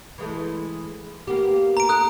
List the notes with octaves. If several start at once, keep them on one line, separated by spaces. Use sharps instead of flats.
E3 G#3 A3
A#3 B3 G4
A#5 D7
A4 D#6 F#6